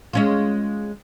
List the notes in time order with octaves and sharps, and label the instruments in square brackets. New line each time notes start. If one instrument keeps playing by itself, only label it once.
[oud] G#3 C#4 F4